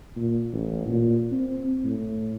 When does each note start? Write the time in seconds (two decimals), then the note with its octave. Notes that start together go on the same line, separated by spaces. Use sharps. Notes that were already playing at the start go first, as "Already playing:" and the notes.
0.16 A#2
0.53 A1
0.88 A#2
1.32 C4
1.84 A2